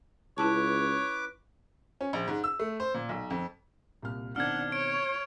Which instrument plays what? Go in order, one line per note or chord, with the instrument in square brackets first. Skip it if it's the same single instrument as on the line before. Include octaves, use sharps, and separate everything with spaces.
[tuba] C#2 [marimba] C#4 E4 A5 [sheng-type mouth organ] B4 D6 [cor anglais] C#5
[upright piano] C#4
A#1
G#2
E6
A3
C5
A#2
B1
F2
[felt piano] C2 A#2 F6
[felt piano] B2 D#3 C4 [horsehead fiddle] D4 F#5 [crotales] F6 G#6
[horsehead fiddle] C#5 [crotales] D7